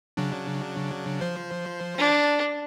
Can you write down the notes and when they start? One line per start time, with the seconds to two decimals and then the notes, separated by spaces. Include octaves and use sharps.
0.17 C#3 F#3 D4
1.21 F3 C5
1.98 D4